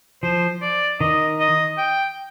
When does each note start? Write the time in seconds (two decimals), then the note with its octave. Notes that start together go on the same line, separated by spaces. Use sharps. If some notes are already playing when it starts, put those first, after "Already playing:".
0.23 F3 C5
0.62 D5
1.00 D#3 D#5
1.40 D#5
1.78 G5